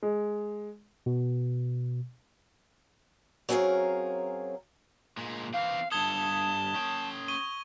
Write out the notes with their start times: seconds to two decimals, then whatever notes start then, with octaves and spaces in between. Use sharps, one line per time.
0.03 G#3
1.06 B2
3.49 F#3 C4 C#4 G#4 A#4 F5
5.17 A#2 G#3
5.54 E3 C4 F5
5.92 G2 A4 A5 D#6 G#6 G7
6.75 C#4 G5
7.28 C#6 D#7 G7